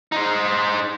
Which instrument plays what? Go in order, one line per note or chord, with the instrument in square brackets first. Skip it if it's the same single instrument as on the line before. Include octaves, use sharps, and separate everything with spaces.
[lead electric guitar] D#4 C5